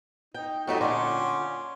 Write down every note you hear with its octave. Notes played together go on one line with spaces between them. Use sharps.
D#4 G5
F2 F#3 A3 D#4 F#4 G4
A#2 D3 C#4 C6 D6